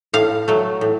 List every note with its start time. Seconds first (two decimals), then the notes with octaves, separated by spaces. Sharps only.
0.13 A2 F5
0.48 F#3 A3
0.81 A2